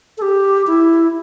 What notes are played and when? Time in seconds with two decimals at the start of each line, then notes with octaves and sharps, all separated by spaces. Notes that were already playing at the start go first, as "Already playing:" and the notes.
0.18 A4
0.22 G4
0.67 E4